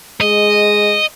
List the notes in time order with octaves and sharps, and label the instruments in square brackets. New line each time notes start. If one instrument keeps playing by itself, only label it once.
[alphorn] G#3 [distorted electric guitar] D#5